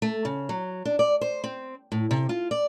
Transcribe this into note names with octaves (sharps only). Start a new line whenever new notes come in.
A3
C#3
F#3
D4
D5
C5
C4
A2
C3
F4
D5